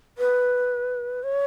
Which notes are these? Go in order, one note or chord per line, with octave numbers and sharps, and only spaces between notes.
B4
C#5